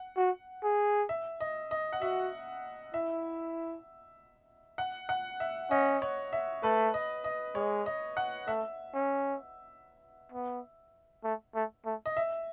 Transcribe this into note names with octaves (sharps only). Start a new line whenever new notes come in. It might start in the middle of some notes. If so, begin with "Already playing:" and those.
Already playing: F#5
F#4
G#4
E5
D#5
D#5
F#5
F#4 E5
E4 E5
F#5
F#5
E5
C#4 D#5
C#5
E5
A3 B4
D#5
D#5
G#3 C#5
D#5
F#5
A3 E5
C#4
B3
A3
A3
A3
D#5
E5